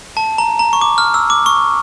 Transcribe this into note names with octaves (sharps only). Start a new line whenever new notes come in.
A5
A#5
A#5
C#6
D6
F6
E6
D6
C#6